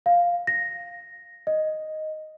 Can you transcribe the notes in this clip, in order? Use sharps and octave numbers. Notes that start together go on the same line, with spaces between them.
F5
A#6
D#5